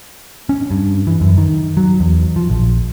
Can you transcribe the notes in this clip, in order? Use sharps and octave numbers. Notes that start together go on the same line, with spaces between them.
C#4
G2
E3
F#2
D#3
F#3
E2
F3
A#1